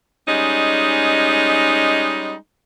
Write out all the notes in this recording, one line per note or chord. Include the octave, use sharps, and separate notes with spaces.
G3 G#3 C#4 D#4